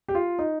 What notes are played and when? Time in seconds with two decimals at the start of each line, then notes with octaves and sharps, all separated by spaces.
0.08 G4
0.15 F4
0.39 D#4